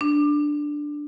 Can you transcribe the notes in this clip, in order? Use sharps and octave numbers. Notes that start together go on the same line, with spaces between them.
D4